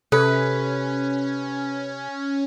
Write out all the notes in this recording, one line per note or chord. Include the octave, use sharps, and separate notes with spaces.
C3 C#4 A4 B4